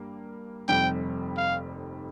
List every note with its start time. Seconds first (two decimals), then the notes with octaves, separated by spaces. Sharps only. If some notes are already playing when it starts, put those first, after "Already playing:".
Already playing: G2 G3 A#3
0.68 F1 F2 D#3 G3 G5
1.37 F5